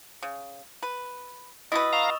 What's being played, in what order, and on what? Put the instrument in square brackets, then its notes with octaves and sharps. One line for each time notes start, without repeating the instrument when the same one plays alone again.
[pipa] C#3
B4
[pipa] E4 F#4 B4 [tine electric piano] D#5 [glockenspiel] D#6 E6 A6
[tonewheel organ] F5 A#5 [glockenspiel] C#6 E7 F7